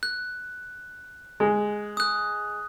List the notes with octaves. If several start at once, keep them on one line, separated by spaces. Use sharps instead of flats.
F#6
G#3
D#6 F#6